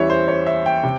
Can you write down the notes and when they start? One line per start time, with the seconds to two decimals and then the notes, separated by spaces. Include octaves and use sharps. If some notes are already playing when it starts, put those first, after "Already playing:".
Already playing: E2 E3 G3 C#4 C#5 E5
0.10 C5
0.28 C#5
0.46 E5
0.66 G5
0.83 C3